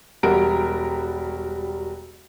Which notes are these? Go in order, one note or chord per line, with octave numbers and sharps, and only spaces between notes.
E1 G3 F#4 A#4 D7